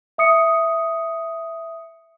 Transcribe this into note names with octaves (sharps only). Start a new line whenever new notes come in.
E5 D#6 C#7